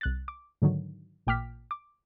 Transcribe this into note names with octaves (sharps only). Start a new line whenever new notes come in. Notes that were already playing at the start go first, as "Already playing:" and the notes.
C2 F#6 A6
D6
G#2 D3 D#3 F#3
A1 A#2 G5 D6 F6 B6
D6